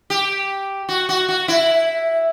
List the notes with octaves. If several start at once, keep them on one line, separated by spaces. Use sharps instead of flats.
G4
F#4
F#4
F#4
E4